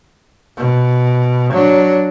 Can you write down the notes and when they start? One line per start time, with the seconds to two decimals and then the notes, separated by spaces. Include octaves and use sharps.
0.57 B2
1.53 F#3 D4